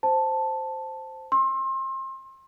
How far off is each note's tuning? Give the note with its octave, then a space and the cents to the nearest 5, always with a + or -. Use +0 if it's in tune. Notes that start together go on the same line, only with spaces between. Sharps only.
C5 +0 A5 +0
C6 +30 E6 +0